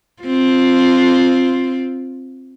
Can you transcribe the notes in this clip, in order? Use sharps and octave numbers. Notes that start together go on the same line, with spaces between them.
C4 F4